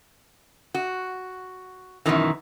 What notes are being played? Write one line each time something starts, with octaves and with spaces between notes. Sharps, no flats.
F#4
F#2 B2 D#3 E3